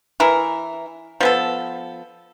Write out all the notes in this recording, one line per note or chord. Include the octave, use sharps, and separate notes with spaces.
E3 E4 A#4
F3 B3 A4